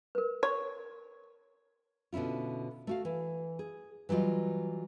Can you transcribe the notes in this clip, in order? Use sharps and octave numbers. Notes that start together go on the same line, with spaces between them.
A#4 B4
C#5
B2 D3 C#4 E4 F4
A3 F#4 F5
E3
G#4
E3 F#3 G3 F4 D#5